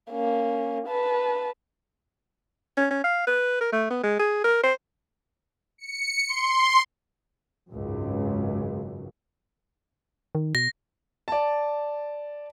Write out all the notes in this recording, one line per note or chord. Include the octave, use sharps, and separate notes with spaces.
A#3 C#4
B4 A5
C#4
C#4
F5
B4
A#4
A3
B3
G#3
G#4
A#4
C5
C#7
C6
G#1 C#2 F#2
D#3
B2 A#6
D5 A5